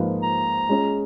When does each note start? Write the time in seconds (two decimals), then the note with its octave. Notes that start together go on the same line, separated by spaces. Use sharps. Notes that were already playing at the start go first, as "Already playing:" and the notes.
Already playing: G#2 F3 A#3 F4 B4
0.23 A#5
0.69 G#3 C#4 G#4